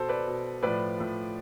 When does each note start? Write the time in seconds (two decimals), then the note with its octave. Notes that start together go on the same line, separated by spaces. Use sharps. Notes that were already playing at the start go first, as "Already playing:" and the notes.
Already playing: B2 A4 C5
0.09 B4 D5
0.27 B2
0.63 A2 F3 B4 D5
0.99 A2 F3